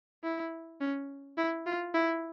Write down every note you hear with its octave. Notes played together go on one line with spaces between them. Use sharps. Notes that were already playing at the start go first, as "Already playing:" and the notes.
E4
C#4
E4
F4
E4